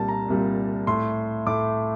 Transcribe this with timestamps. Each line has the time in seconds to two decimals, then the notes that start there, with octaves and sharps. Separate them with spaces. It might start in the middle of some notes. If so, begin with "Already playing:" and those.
Already playing: C2 A#2 G3 A5
0.08 A#5
0.28 C2 A#2 G3
0.87 A2 A3 C6
1.46 A2 A3 D6